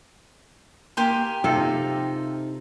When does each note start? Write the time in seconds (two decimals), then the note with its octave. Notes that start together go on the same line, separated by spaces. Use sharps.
0.97 A#3 G4 G#5 C6
1.44 C3 D#4 F4 A4 C5 E5